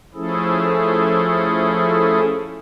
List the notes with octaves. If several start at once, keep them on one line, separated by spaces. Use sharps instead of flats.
F3 A3 C#4 E4 G#4 A4